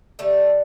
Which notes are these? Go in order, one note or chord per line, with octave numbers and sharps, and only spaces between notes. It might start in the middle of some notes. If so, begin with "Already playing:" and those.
D3 G3 A3